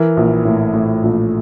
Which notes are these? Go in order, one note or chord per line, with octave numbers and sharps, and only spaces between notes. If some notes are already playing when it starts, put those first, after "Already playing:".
Already playing: E3 A#4
A#1
A2
A2
A#1